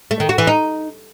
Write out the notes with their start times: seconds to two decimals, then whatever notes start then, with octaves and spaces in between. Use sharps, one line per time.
0.11 A3
0.20 D#3
0.29 F#4
0.38 E3
0.47 D#4